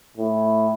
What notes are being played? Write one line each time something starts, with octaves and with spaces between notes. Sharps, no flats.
A2